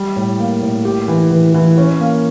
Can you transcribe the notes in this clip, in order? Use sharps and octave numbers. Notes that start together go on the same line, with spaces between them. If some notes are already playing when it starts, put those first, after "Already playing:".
Already playing: G3
A2
A#3
A2
G4
E3
E3
E3
C#4
A#3